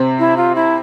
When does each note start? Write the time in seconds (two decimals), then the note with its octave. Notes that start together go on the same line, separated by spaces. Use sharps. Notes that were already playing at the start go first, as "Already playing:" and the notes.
Already playing: C3 C4
0.19 E4
0.37 F4
0.55 E4